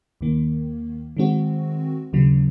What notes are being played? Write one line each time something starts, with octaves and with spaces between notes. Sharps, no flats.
D#2 D#3 A#3
D#3 G#3 C4 F#4
D#2 C#3 F#3